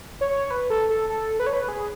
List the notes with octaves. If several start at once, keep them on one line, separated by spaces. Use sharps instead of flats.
C#5
B4
A4
A4
A4
B4
C#5
B4
G#4